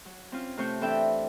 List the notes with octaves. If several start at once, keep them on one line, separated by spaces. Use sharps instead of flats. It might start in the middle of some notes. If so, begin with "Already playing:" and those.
F#3
C4 C#4 F4
C3 A3 C4 C5 C#6 G6
E3 C4 D4 A4 E5 G5